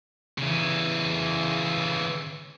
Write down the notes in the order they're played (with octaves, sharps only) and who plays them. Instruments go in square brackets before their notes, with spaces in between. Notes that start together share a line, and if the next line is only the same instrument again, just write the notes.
[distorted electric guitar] C#3 E3